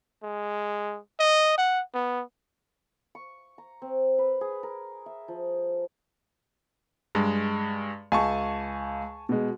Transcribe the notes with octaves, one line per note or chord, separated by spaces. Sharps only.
G#3
D#5
F#5
B3
C#6
A#5
C4
B4
G#4
A#4
E5
F3
G2 G#3
C#2 G#5 A5 C#6
B2 G#3